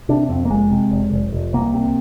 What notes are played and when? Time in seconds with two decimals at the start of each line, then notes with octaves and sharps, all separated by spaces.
0.09 C3 D4
0.29 F2 C4
0.45 A#3
0.50 F1 G#3
0.71 C3
0.91 F1
1.11 F1
1.33 F1
1.53 C2 A#3
1.74 C3